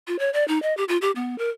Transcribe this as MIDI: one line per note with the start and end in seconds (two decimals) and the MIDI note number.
0.08 0.19 65
0.19 0.30 73
0.33 0.46 74
0.48 0.60 63
0.62 0.75 75
0.77 0.84 67
0.89 0.97 65
1.02 1.11 67
1.16 1.38 59
1.38 1.49 70